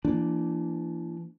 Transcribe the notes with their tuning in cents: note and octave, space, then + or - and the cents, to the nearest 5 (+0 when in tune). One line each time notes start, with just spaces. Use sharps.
E3 +35 A#3 +0 D4 -5